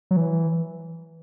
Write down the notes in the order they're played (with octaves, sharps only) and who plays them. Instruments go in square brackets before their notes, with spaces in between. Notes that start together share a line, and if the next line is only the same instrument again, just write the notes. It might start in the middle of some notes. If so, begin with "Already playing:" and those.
[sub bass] F#3
E3